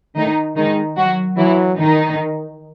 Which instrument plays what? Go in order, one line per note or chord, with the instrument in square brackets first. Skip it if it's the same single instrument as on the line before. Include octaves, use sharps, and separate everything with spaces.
[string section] D#3 D#4 [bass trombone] A3
[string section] D#3 D#4 [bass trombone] G#3
[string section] F#3 F#4
[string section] E3 E4 [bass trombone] F#3
[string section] D#3 D#4